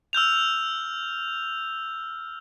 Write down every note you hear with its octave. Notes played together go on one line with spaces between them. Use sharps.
E6 F6 G6 F7